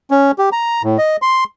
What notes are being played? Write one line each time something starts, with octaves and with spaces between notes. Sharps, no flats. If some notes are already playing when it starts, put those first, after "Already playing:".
C#4
G4
A#5
A2
D#5
C6